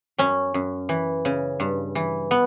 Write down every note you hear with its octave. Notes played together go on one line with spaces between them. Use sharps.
F#2 C#4
F#2
E3
C#3
G2
E3
B3